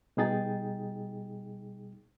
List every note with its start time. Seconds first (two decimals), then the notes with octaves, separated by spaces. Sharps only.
0.17 B2 G3 D#4 G#4 G5 A6